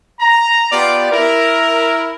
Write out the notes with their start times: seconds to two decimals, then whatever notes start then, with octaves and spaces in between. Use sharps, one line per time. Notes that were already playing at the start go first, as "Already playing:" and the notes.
0.20 A#5
0.71 B3 F4 G4 D5
1.11 E4 A#4